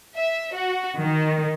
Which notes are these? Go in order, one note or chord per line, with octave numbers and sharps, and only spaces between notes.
E5
F#4
D#3